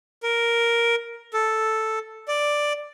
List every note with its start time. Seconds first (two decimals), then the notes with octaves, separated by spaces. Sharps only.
0.23 A#4
1.33 A4
2.28 D5